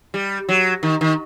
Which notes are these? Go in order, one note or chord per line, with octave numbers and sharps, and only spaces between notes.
G3
F#3
D#3
D#3